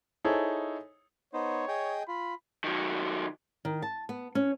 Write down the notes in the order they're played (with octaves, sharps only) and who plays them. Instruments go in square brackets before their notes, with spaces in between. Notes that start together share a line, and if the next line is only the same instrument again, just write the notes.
[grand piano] D#4 E4 G#4 A4 C5 C#5
[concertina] B3 D#4 C5 [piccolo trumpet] C#5
[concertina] G#4 D#5 G5
[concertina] F4 [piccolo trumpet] B5
[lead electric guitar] D#3 F#3
[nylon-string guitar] D#3
A5
B3
C#4